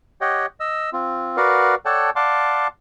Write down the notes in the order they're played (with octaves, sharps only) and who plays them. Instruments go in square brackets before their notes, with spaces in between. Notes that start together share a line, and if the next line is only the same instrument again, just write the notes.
[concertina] G4 C#5 D#5 F#5 G5
D#5 E6
C4 F4
F#4 A#4 B4 D5 F5 F#5
A4 C#5 D5 F#5 G5 A5
D5 F5 F#5 A5 C6 D6